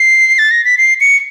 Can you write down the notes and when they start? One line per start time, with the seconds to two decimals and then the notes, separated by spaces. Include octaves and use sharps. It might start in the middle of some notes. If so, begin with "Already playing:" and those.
Already playing: C7
0.39 A6
0.51 A#6
0.65 B6
0.78 C7
1.01 C#7